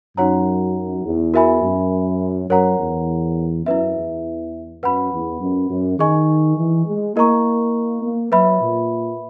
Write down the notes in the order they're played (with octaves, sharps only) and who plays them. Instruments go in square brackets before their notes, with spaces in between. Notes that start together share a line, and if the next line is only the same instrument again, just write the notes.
[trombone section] F#2 [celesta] D#4 F#4 C#5 F#5 A#5
[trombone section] E2
[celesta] F#4 A#4 E5 G#5 B5
[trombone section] F#2
[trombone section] F#2 [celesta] A#4 C#5 F#5 A#5
[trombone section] E2
[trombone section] F#2 [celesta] E4 B4 E5
[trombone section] E2
[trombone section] F#2 [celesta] B4 F#5 B5
[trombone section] E2
F#2
F#2
[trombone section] D#3 [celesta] G#4 D#5 G#5 C#6
[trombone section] E3
G#3
[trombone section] A#3 [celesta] E4 A#4 D#5 A#5 C#6
[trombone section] A#3
[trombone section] F#3 [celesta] B4 E5 B5
[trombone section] A#2